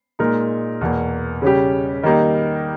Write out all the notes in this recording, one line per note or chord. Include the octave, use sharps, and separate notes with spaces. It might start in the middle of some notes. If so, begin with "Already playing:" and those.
A#2 G#3 D#4 A#4
E2 B2 A#3
C#3 G3 C#4 G4
D#3 G3 A#3 D#4